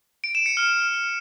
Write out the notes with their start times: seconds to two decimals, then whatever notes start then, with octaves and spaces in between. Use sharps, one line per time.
0.24 D7
0.35 E7
0.46 C#7
0.57 F6